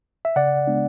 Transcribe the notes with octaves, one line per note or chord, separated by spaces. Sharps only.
E5
C#3 D5 F#5
G#3 B3 D4